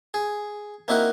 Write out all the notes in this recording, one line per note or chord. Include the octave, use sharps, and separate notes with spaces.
G#4
A#3 C4 D#4 E4 F#4 A#4